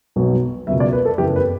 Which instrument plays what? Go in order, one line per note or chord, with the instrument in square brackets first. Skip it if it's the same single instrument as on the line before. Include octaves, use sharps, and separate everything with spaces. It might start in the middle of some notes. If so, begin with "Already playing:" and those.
[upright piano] B1 B2 F#3
C#2 B2 F#3 E5
D5
B4
A4
F#1 F#2 E3 B3 G4
B4